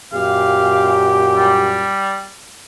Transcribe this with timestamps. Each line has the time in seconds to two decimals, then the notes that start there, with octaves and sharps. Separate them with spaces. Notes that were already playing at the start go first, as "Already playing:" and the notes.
0.13 F#2 A#2 G4 F5
1.36 G3